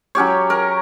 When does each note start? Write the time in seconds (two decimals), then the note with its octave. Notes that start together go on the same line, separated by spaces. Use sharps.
0.15 F#3 C#4 G4 C#5
0.50 A#4